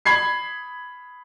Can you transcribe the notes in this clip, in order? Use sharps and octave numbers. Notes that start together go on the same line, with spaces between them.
B5 G#6 C7